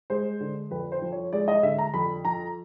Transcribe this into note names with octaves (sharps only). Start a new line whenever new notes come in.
G#3 C5
D3
F2 B4
C5
F3
C#5
G#3 D5
D#5
D3 E5
A#5
F2 B5
F3 A#5